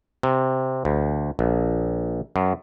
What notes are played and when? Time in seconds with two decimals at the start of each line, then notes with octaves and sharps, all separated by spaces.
0.23 C3
0.85 D2
1.39 A#1
2.36 F#2